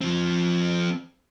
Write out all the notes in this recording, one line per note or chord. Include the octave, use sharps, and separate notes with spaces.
F3 C4